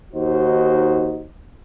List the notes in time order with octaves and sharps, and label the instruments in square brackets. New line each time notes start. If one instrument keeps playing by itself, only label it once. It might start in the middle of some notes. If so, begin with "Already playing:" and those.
[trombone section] D#2 D#4 F#4 C5